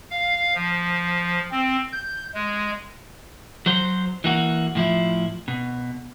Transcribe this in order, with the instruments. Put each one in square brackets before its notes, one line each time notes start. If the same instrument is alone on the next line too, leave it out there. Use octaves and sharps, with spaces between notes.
[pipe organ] F5
F3
C4
G6
G#3
[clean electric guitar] F#3 C5
E3 A#3 F#4
A2 F3 E4
B2